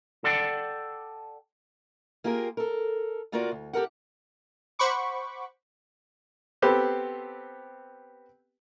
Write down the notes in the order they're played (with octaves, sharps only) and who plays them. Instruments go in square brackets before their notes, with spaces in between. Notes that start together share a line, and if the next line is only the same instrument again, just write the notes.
[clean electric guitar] A4 D5 F#5 G5 A5
[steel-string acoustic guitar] A#3 F4 G4 G#4 A#4
A4 A#4
D2 A#3 F4 F#4 A#4 D5
D2
G4 A4 A#4 F#5
[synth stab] C5 F#5 B5 C#6 D6
[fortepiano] B3 C4 G4 A4